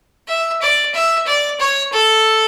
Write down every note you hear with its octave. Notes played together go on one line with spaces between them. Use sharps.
E5
D5
E5
D5
C#5
A4